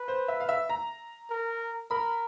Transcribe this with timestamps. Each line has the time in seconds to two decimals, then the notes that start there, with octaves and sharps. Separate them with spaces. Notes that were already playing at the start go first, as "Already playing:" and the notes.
Already playing: B4
0.08 C5
0.28 E5
0.40 F5
0.49 E5
0.69 A#5
1.30 A#4
1.91 A#4 B5